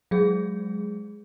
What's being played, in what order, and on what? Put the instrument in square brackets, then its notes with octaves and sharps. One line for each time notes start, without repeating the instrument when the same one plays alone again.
[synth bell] F#3 G#3 G#4